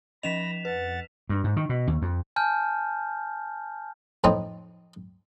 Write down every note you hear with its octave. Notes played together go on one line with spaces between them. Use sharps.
F3 C#4 D#5 B5 A#6 B6 E7 F7
F2 B4 F#5 A6
G2
G#2
D#3
B2
D#2
F2
G#5 A5 F6 G6
F2 A2 C4 D#4